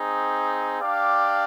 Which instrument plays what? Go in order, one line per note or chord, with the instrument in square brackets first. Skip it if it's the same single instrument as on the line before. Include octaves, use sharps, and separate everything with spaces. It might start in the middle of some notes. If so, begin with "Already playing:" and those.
Already playing: [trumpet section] C4 D#4 G#4
D4 G4 D5 F5